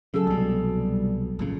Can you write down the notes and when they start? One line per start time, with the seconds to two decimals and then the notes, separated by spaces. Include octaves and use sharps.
0.14 C#3 F#3 G#4 A4 E6
0.27 C2 B2 G3
1.39 G#1 A#2 C#3